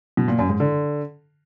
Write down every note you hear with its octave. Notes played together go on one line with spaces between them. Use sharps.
B2
A#2
F#2
G#2
D3